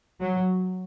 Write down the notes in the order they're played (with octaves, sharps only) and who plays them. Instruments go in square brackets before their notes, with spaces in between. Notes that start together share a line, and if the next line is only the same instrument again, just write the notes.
[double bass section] F#3